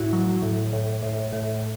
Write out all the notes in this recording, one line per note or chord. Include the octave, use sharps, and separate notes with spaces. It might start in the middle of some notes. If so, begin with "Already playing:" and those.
Already playing: A2 E4 F#4
F#3
A2
A2
A2
A2